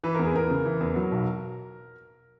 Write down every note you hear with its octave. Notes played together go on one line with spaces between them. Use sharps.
E3 B4
E2 A#4
G#4
E2 A#4
C#3
E3
E2
F#3
B1